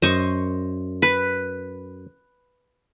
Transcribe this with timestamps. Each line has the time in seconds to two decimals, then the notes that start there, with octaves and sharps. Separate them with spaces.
0.02 F#2 C5 D#5 C#6
1.02 B4